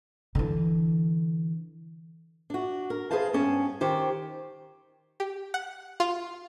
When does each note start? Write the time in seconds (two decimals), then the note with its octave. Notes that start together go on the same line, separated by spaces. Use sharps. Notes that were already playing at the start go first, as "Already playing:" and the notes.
0.35 D3 E3
2.50 D4 F#4
2.90 A#4
3.11 G#4 B4 C5 F5 A5
3.33 G2 B3 C#4 A5
3.81 D#3 G4 C5 C#5
5.20 G4
5.54 F#5
6.00 F4